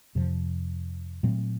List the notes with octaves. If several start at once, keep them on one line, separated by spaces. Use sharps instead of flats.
F2 C3 F3
A#2 F#3 A3 C4